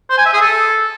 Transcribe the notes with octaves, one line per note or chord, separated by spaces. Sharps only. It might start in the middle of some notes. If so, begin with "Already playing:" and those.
C5
G#5
E5
G#4
A4